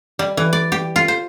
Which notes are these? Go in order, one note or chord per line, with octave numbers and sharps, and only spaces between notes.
G3
E3
D5
G4
F4
C5